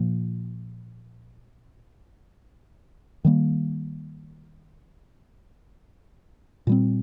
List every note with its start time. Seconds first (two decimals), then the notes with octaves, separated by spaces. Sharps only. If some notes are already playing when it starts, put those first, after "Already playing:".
Already playing: A#2 F3 A#3
3.25 D#3 G3 A#3
6.67 A#2 G3 C4